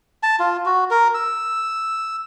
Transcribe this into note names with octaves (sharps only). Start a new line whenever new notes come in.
A5
F4
F#4
A#4
E6